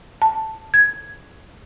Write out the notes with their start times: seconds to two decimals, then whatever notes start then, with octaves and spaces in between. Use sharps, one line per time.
0.22 A5
0.74 G#6